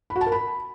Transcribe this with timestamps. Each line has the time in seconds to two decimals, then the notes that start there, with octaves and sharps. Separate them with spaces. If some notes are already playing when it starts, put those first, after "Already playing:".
0.10 B5
0.16 F#4
0.21 A5
0.27 A#4
0.32 B5